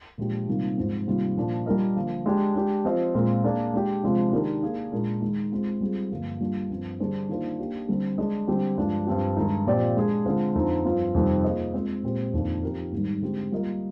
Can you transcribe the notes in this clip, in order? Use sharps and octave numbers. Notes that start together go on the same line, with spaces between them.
A#2 F3 G#3 D4 G4
C3 D#3 G3 A#3 F4
G#2 F3 C4
C3 D#3 G3 A#3 F4
A#2 F3 A#3 D4
G3 D4 F4 A#4 D#5
D3 F3 A#3
G#3 D4 G4
G#3 D4 G4
F3 C4 F4 C5 D#5
A#2 G#3 C4 F4 A#4
A#3 D4 G#4 D5
G#3 D4 G4
C3 F3 G#3 D4 F4
D#3 G#3 D4 G4 A#4
A#3 D4 G#4
A#2 G#3 D4 F4 A#4
D#3 G#3 D#4
G#3 C4 F4
G3 C4 F4 G#4
G2 D3 F3 A#3 F4
G3 A#3 D4 F4
G2 F3 C4
D3 G3 D4 G#4 C5
D#3 A#3 D4 F4 C5
A#3 D4 G4
D3 G3 C4
G#3 D4 G#4 D#5
D3 G3 C4 G4
G2 F3 G#3 D4
G2 F3 C4 G4
G2 D#3 G#3 D#4
A#2 F3 C4 G4 D5
G#3 D4 G#4
D3 G#3 C4 F4 C5
F2 D3 F3 C4 D#4
G2 F3 C4 F4
F2 C3 D#3 G3 C4
A#3 F4 G#4 C5 D#5
G#3 C4 F4 C5
A#2 G#3 C4 G4
F2 D#3 A#3 D4
F3 C4 D#4 G4 A#4
G#2 D#3 G3
D3 G#3 C4 G4
G3 A#3 F4 A#4 D#5